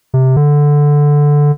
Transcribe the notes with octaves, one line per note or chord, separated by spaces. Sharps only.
C3
D3